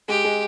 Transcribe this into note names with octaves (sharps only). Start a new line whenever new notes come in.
G#3 G4
G#3